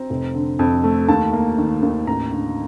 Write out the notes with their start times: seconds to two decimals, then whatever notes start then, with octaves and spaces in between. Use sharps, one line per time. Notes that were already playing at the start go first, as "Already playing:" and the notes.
Already playing: C4 A#5
0.10 F1
0.34 D3
0.59 F2
0.84 A3
1.09 D#2 A5
1.33 A#3
1.58 D#3
1.82 D#2
2.07 A1 A#5
2.32 D3